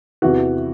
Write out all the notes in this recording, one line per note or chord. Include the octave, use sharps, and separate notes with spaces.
E2 C3 E3 F#4